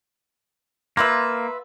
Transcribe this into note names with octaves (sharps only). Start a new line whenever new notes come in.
A#3 F4 B4 E5